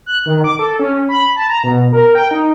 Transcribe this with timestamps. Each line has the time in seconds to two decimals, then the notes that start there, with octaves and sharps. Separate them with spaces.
0.06 F#6
0.26 D#3
0.44 D6
0.59 A4
0.79 C#4
1.09 B5
1.36 A5
1.49 A#5
1.64 B2
1.93 A#4
2.15 G5
2.31 D#4